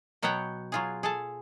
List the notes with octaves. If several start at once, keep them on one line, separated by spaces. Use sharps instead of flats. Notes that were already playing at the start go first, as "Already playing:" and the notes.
B2 F#3 B3 C#5 F#5 G5
F#3 F4 G#4
G#4 A4 A5